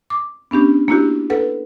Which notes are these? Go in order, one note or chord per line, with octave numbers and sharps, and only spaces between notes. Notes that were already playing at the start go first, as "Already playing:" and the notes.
D6
B3 C#4 D4 G4
A#3 D4 E4 F#4 G4
A4 B4 F#5